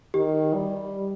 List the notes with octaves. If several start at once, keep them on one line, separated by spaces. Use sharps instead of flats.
D#3 G4
G3